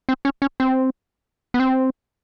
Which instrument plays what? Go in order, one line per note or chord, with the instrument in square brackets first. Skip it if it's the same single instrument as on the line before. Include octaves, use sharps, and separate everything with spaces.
[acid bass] C4
C#4
C#4
C4
B3
C4